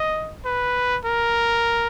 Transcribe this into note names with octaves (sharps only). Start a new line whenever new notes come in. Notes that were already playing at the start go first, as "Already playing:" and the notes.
Already playing: D#5
B4
A#4